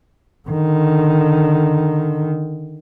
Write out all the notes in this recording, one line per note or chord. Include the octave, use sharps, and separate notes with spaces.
D3 D#3